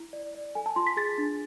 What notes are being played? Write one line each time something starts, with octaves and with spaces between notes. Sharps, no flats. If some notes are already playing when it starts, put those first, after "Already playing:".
Already playing: E4
D5
D5
A4 G#5
A5
F4 C6
B6
G#4 A6
D4